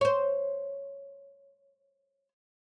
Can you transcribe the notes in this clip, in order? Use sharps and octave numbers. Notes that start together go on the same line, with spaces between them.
C5 C#5